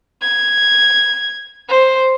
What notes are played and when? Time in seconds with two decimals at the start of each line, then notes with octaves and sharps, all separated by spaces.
0.22 G#6
1.68 C5